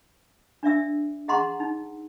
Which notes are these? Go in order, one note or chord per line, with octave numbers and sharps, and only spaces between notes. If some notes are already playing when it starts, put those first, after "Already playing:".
D4 D5 E5 E6
G#4 D#5 F#5 A#5 C6 C#6
D#4